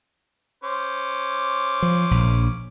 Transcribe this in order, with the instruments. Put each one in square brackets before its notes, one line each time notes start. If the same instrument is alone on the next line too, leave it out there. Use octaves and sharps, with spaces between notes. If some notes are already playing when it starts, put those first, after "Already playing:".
[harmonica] C#4 C5 D6
[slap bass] F3
A#1